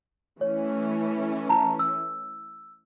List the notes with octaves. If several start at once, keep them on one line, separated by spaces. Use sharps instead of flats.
E3 A3 C#4 C#5
A5 A#5
E6